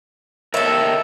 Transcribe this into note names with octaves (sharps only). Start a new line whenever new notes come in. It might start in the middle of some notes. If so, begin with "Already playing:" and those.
A4 A#4 C#5 D#5 E5